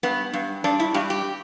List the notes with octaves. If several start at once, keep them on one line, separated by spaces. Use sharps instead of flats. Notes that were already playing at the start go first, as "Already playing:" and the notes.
G2 B3
G2
G2 D4
E4
G2 G4
G4